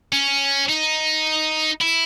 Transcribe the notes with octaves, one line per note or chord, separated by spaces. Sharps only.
C#4
D#4
E4